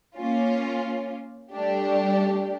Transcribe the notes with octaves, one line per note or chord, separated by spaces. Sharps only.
A#3 C#4 F4
G3 A3 D4 G4